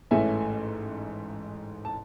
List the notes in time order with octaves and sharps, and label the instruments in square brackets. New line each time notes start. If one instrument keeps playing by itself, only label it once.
[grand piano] A1 G#2 E3 A3 C#4 E5 G#5
A5